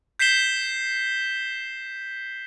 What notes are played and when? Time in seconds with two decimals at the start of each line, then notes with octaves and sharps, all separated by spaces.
0.19 G6 B6 C7 E7 G7